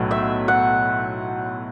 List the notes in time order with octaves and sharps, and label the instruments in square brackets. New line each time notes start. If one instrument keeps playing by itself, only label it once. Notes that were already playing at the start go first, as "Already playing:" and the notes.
Already playing: [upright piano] B1 A2 F#3 [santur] F#4
[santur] E5
F#5